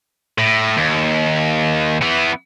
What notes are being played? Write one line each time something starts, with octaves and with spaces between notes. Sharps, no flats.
A2
D#2
E3 B3